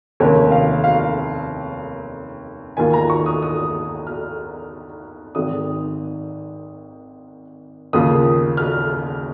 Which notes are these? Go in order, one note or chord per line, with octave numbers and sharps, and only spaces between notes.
F1 D#2 D#3 A#3 C#4 C#5
F5
F5
D#2 D#3 A#3 F4 G#5
A#5
C#6
D#6
D#6
F6
G#1 G#2 D#3 D#6
D#2 C#3 A#3 F4 D#6
F6